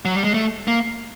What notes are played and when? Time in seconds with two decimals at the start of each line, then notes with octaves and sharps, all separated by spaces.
0.05 F#3
0.15 G3
0.24 G#3
0.34 A3
0.68 A#3